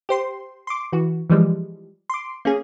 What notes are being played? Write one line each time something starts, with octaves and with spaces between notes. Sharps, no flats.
G4 C5 C6
C6 D6
E3 F#4
E3 F3 G3 G#3
C6 D6
A#3 C#4 G#4